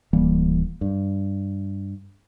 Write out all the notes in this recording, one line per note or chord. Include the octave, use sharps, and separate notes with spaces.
D1 E3 G3 A#3
G2